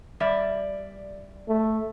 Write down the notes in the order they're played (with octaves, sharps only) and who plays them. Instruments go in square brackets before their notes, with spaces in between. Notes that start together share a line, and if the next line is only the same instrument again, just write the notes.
[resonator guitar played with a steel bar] G3 D5 E5
[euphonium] A3